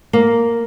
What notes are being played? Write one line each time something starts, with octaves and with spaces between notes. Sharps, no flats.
A#3